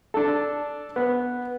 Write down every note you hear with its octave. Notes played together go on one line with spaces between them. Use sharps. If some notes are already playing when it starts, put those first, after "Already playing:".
D4 A4
B3